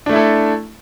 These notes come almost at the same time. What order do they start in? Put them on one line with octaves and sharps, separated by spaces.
D4 A3 E4 A4